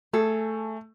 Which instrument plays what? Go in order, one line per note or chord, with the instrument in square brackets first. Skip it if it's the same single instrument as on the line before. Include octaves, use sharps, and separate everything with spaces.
[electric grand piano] A3 [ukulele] G#4 A4